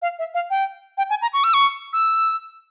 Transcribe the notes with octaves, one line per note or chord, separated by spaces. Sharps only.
F5
E5
F5
G5
G5
G#5
A#5
C#6
E6
C#6
E6